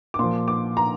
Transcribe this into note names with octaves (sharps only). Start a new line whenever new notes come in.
D6
A#2 F3 C6
D6
A#5